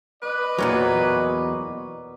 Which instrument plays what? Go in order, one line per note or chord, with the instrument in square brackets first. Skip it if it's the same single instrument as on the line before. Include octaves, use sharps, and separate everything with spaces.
[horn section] B4 D#5 [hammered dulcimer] D5
[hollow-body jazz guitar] E2 A#2 F#3 [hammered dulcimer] A#4 C5
[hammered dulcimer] B2 D6